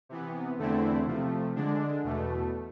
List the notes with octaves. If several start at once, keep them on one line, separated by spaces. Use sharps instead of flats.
C3 E3 B3
E2 D3 A3 C4 E4
C3 F3 A3
D3 G#3 D4
E2 B2 A3